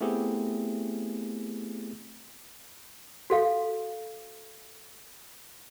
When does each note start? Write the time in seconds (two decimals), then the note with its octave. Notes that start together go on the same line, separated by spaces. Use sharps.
0.01 A3 B3 C4 E4 G4 G#4
3.30 F#4 A4 F5